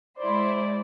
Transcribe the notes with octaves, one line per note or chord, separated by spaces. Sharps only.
G#3 E4 C5 D5